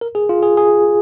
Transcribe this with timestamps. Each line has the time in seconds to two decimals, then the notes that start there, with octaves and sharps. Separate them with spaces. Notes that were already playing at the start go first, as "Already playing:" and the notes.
0.01 A#4
0.15 G#4
0.29 F4
0.43 G#4
0.57 G#4